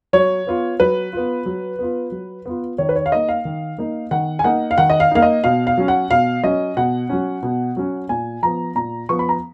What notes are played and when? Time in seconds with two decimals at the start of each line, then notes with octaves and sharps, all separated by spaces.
0.13 F#3 C#5
0.47 B3 F4
0.80 F#3 B4
1.13 B3 F4
1.46 F#3
1.79 B3 F4
2.12 F#3
2.46 B3 F4
2.78 D#3 C#5
2.89 B4
2.96 C#5
3.06 F5
3.12 A#3 D#4 D#5
3.28 F5
3.45 D#3
3.78 A#3 D#4
4.11 D#3 F#5
4.39 G#5
4.44 A#3 D#4 F#5
4.71 F5
4.78 D#3 F#5
4.90 D#5
5.00 F5
5.11 A#3 D#4 F5
5.22 D#5
5.44 B2 F5
5.67 F5
5.78 F#3 C#4
5.88 F#5
6.11 B2 F5
6.43 F#3 C#4 D#5
6.77 B2 F#5
7.09 F#3 C#4
7.43 B2
7.77 F#3 C#4
8.09 A#2 G#5
8.43 F3 B3 A#5
8.75 A#2 A#5
9.09 F3 B3 C#6
9.19 B5
9.29 A#5